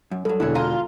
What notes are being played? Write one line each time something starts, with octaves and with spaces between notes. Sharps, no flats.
F#2
G2 F#3 A4
E1 D3 E4 G#4 C#5
F4 G#5 A#5